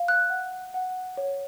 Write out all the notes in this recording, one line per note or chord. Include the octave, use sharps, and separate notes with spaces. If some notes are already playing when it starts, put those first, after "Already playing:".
Already playing: F5
F#6
F#5
F#5
C#5